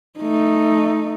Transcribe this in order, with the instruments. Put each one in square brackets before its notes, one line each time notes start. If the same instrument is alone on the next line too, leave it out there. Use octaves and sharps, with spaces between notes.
[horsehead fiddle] A3 D#4